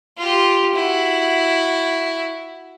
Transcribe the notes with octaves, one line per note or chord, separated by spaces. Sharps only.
F4 G4
E4 F#4